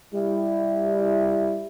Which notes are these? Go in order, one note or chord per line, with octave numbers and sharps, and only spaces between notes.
G3 E4